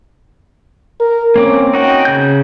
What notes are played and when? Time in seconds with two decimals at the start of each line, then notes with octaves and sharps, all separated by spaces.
1.00 A#4
1.36 A#3 C4 C#4 D6
1.73 D#4 F#4 G5
2.05 C#3 G6